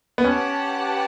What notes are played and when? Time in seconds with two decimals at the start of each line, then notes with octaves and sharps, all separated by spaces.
0.18 B3
0.24 C#4 G4 B4 F#5 A5